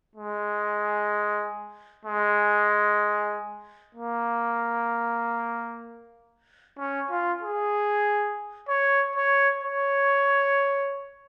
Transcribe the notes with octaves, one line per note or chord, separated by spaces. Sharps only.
G#3
G#3
A#3
C#4
F4
G#4
C#5
C#5
C#5